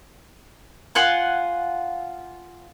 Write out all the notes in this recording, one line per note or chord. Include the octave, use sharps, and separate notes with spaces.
F4 F#5 G#5